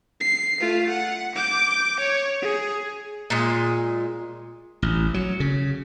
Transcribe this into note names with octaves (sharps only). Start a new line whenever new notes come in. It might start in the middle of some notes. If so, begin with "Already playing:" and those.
C7
A3 F4
F#5
D6 G6
C#5
G#4
A#2 G#3
A1
F#3
C#3